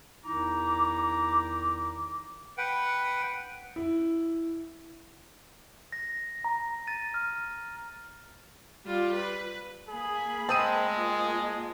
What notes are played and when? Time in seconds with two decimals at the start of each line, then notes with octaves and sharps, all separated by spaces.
0.25 E2 D#3 D#4 E4 A#5 D6
2.58 B4 F#5 G5
3.76 E4
5.92 A#6
6.44 A#5
6.87 A6 D#7
7.14 F6
8.85 G3 F4
9.15 B4
9.88 A#3 G#4 B5
10.49 G#3 C4 A5 D#6 D#7
10.89 A#3 F4 D#5